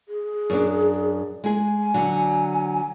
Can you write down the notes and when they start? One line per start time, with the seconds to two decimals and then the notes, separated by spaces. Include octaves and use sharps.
0.09 G#4
0.50 F#2 D4
1.44 G#3 G#4
1.78 G#5
1.94 D3 F#3